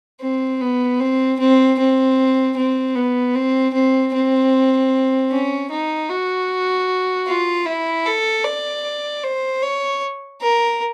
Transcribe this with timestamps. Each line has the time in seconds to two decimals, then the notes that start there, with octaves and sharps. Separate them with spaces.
0.21 C4
0.61 B3
1.00 C4
1.39 C4
1.79 C4
2.56 C4
2.95 B3
3.35 C4
3.74 C4
4.14 C4
5.31 C#4
5.70 D#4
6.09 F#4
7.27 F4
7.66 E4
8.06 A4
8.44 D5
9.23 C5
9.62 C#5
10.41 A#4